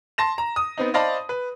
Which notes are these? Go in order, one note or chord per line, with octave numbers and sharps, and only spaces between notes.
A5 C6 A#6 E7
A#5
D#6
B3 C4 D#4
C5 D5 D#5 F5 A5 B5
B4